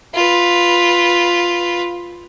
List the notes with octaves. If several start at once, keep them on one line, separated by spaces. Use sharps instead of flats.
F4 B4